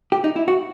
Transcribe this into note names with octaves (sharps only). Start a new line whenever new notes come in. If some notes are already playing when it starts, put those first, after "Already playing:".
G4
D#4
E4
F#4